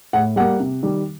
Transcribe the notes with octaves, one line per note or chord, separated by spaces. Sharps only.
A2 F#5
G3 A#3 F#5
C3
D#3 G3